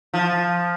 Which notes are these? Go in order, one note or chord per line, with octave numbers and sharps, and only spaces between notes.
F3